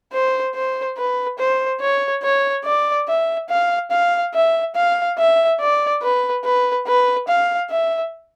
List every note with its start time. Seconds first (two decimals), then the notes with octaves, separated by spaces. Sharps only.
0.13 C5
0.54 C5
0.97 B4
1.39 C5
1.80 C#5
2.22 C#5
2.65 D5
3.08 E5
3.49 F5
3.91 F5
4.34 E5
4.75 F5
5.18 E5
5.60 D5
6.02 B4
6.44 B4
6.87 B4
7.28 F5
7.70 E5